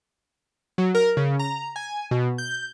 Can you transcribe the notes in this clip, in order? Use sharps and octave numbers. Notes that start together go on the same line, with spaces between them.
F#3
A#4
C#3
A#5
G#5
B2
G6